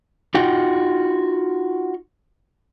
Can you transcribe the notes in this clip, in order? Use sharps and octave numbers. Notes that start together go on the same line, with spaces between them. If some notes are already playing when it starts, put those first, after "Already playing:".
D#4 F4 F#4 G5